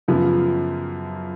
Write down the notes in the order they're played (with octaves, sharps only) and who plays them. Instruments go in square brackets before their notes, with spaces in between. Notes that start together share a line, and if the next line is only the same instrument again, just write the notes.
[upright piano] F#2 C#3 F3 B3 F4